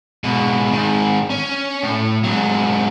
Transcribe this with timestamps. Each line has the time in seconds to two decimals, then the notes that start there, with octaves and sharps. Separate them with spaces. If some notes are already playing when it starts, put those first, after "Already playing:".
0.24 G#2 B2
0.72 G#2 D#3
1.30 C#4
1.82 A2
2.24 G#2 F#3